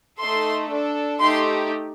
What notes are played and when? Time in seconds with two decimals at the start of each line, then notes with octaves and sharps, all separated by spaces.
0.21 A3 D#4 A4 C6
0.70 D4 A4
1.20 A3 D#4 G4 C6